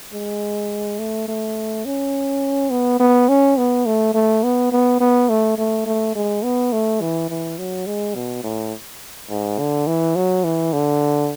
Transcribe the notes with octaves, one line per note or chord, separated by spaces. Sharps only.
G#3
A3
A3
C#4
B3
B3
C#4
B3
A3
A3
B3
B3
B3
A3
A3
A3
G#3
B3
A3
E3
E3
F#3
G#3
B2
A2
G#2
D3
E3
F#3
E3
D3